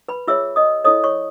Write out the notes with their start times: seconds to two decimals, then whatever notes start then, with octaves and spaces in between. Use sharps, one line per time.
0.08 B4 B5
0.28 F4 G#4 C#5 E5 E6
0.56 D#5 D#6
0.84 E4 A4 C#5 D#5 D#6
1.04 C#5 C#6